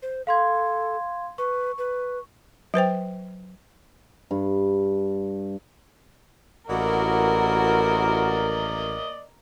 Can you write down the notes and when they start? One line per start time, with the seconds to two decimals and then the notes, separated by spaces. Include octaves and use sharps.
0.02 C5
0.27 A4 F5 C6 G#6
1.38 B4 C#6
1.78 B4
2.74 F#3 B4 C5 G5
4.31 G2
6.70 A1 A#3 E4 F#4 A#4 D5 D#5